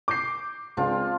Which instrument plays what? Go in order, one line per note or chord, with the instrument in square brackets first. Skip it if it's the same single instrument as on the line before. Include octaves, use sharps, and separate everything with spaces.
[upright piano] D6 G6 C7
[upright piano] C#2 [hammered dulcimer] C4 D4 F4